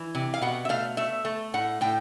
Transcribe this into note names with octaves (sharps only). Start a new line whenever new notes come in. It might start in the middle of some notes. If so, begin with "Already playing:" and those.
Already playing: E3
C3
F5
B2 F#5
E5
A3 F5
A3 E5
A3
A2 F#5
A2 G5